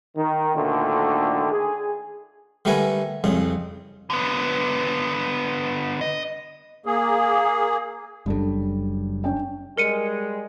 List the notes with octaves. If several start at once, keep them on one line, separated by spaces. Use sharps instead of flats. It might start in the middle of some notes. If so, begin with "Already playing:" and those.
D#3
D2 A#2 D3 D#3
G#4
D3 G3 A3 A#4 B4 G#5
C2 F2 C#3
D3 B3
D#5
A#3 G#4
F#1 F#2 G3 D4 A4
C#4 D4 G5
G3 G#3 A#4 C#7 D#7